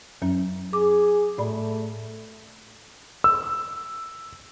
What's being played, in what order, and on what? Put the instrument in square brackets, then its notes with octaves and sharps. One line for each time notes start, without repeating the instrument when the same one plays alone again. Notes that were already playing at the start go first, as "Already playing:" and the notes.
[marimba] F#2 F#3 C#4
[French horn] G#4 [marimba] D6
[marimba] A2 D5 B5 [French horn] A3
[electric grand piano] E6